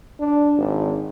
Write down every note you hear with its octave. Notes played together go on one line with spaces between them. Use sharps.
D4
G#1